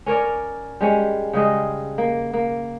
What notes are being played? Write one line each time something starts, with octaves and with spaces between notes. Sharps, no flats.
C#4 A#4 C#5 D5
G3 G#3 C#4
C#3 G3 G#3 D#5
A#3
A#3